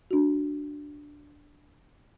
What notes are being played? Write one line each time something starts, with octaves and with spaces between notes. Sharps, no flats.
D4 F#4